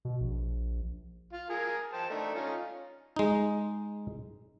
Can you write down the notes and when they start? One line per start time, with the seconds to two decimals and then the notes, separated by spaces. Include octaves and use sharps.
0.05 B2
0.20 A#1
1.33 F4
1.50 G#4 A#4
1.93 C5 G5 A5
2.10 A3 D4 D#4
2.35 C#4 D#4 F4
3.16 G#3 D#4